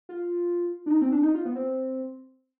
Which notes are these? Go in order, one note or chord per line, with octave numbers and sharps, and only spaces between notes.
F4
D4
D#4
C4
D4
D#4
F4
B3
C4